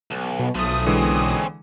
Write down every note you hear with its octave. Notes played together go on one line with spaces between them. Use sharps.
B1
B2
B1 F3 A3 D#6
D3 E3 G#3 C4 C#4